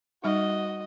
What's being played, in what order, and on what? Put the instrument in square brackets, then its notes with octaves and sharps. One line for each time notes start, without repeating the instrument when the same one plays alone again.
[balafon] G3 D#4 [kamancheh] F#4 D#5